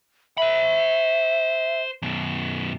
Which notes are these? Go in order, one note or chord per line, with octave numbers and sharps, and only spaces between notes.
C5 E5 B5
F#2 B2